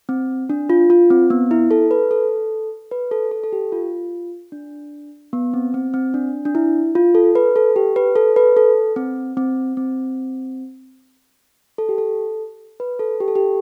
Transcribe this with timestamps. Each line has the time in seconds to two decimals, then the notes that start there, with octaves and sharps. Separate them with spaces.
0.09 C4
0.50 D4
0.70 F4
0.90 F4
1.10 C4
1.30 B3
1.51 E4
1.71 A4
1.91 B4
2.11 A4
2.91 B4
3.11 A4
3.31 A4
3.44 A4
3.53 G4
3.72 F4
4.52 D4
5.33 B3
5.54 C4
5.74 C4
5.94 C4
6.14 D4
6.45 D4
6.55 E4
6.95 F4
7.15 A4
7.35 B4
7.56 A4
7.76 G4
7.96 B4
8.16 A4
8.36 B4
8.57 A4
8.96 C4
9.37 C4
9.77 C4
11.78 A4
11.89 G4
11.98 A4
12.80 B4
12.99 A4
13.20 G4
13.28 A4
13.35 G4